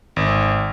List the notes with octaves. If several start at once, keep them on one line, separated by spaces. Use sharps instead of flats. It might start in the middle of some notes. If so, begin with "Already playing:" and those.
G#1